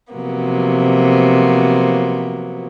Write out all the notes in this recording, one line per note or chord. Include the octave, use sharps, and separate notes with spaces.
C3 F3 F#3 A#3 B3